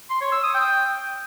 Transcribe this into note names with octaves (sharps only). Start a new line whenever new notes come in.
C6
C#5
E6
D#6
G5